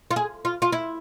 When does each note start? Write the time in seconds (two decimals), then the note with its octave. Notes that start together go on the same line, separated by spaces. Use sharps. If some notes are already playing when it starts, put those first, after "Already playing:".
0.11 F4
0.16 G#4
0.45 F4
0.62 F4
0.72 E4